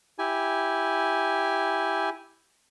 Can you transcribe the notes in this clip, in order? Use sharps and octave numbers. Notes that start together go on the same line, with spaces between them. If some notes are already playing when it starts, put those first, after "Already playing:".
E4 G4 G#5